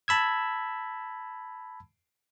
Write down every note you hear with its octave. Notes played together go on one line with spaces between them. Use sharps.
A5 B5 E6 G#6